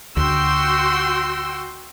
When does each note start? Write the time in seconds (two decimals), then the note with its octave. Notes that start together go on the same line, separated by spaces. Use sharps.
0.17 D2 F#4 G5 C6 E6